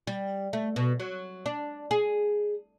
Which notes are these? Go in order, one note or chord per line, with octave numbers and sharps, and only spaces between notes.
G3
A3
B2
F#3
D4
G#4